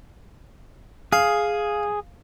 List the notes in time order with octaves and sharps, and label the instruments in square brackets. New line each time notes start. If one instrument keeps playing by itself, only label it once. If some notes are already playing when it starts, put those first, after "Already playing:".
[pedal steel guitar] G#4 [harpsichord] F5